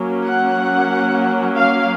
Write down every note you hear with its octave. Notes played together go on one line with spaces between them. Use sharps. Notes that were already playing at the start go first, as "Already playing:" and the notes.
Already playing: F#3 A#3 C#4
F#5
F5